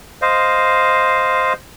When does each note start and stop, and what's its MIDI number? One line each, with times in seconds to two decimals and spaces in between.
0.22 1.53 72
0.22 1.53 75
0.22 1.53 77